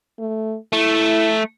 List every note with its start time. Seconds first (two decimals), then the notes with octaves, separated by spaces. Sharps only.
0.19 A3
0.73 A3 E4